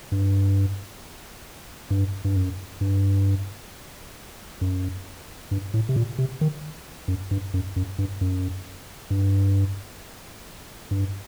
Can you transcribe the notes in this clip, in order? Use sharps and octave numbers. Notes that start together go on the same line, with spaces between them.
G2
G2
G2
F#2
G2
F#2
G2
A2
C3
A#2
C3
D#3
F#2
G2
F#2
F#2
G2
F#2
G2
G2